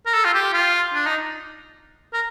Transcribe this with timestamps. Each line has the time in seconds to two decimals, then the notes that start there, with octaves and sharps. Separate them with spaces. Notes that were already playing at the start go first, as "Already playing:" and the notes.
0.06 A#4
0.14 A4
0.25 F4
0.34 G4
0.53 F4
0.94 D4
1.06 D#4
2.14 A#4